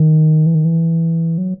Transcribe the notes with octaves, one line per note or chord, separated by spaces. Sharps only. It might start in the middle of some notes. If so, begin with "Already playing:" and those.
Already playing: D#3
E3
D#3
E3
F#3